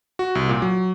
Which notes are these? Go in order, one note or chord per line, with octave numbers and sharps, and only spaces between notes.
F#4
C2
A#2
F#3